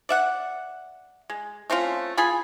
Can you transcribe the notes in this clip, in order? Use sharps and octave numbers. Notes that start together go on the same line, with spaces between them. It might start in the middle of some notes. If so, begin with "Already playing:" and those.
D5 E5 F#5
G#3
A3 C4 C#4 F4
F4 G#4 G#5 B5